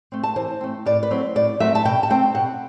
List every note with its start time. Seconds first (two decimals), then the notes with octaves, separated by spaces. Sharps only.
0.12 A3 C4
0.23 A5
0.36 E3 C5
0.61 A3 C4
0.86 A2 D5
1.03 B4
1.11 F#3 A3 C4
1.35 A2 D5
1.60 F#3 A3 C4 E5
1.75 A5
1.85 B2 G5
2.03 A5
2.10 A3 C4 G5
2.35 B2 F#5